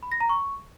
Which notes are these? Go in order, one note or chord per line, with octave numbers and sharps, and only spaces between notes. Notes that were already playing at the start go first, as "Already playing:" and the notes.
B5
A#6
A#5
C#6